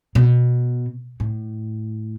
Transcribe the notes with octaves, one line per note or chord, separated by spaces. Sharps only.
B2
A2